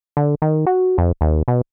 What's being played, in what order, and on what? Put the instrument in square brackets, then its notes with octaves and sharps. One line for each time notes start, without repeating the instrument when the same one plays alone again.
[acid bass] D3
D#3
F#4
F2
D#2
B2